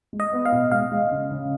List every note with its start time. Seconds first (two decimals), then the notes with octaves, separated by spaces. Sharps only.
0.13 G#3
0.20 D#5
0.33 B3
0.45 F5
0.52 B2
0.71 G#3 F5
0.92 G#3
1.11 C#3
1.31 C#3